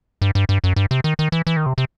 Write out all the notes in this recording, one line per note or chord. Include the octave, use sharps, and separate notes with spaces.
G2
G2
G2
F#2
G2
C3
D#3
D#3
E3
E3
D#3
C3
C3